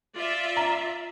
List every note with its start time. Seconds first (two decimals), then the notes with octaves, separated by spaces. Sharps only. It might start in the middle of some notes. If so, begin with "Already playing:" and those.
0.15 F4 D5 E5
0.57 A#5